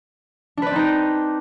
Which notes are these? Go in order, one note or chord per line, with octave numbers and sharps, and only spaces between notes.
C4 D4 D#4 B4 D5